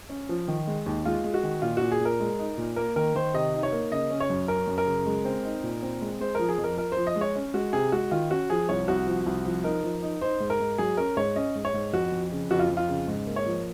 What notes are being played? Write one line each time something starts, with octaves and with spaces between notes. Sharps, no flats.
C#4
F3
D#3
G#3
D#2
G#3 F4
G#3
F#4
D#3
A#2 F4
A#2 F#4
G#4
A#2
A#4
G#3
D#4
A#2
A#3 A#4
D#3 A#4
D#3 C5
C3 D#5
D#4
C#5
A#3
C#3 D#5
C#4
C#5
F#2
C#4 A#4
F#2
A#4
C#3
G#3
C4
D#4
A#2
C4
G#3
G#3 C5
F3 A#4
G#4
F2
A#4
F3 A#4
C5
F3
D#5
G#3
C#5
C#4
G#3 F#4
C3 G#4
G#3 F#4
D#3 F4
C#4 F#4
F3 G#4
C2 C#5
C2 F#4
F3
C2
F3
D#4 A#4
F3
D#4
D#4 C5
G#2
A#4
G#2
F#3 G#4
C#4 A#4
G#2 C#5
C#4 D#5
G#2
C#5
G#2
F2 F#4
F2
C#3
F2 F#4
F4
F2
F4
C#3
G#2
A#3
C#5
F3